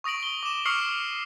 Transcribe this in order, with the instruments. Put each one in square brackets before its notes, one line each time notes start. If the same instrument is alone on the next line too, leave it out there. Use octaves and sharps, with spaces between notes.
[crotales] C#6 D#6 A#6 D7 F#7
G7
D6 E7
C#6 D#6 F6 C7 C#7 F#7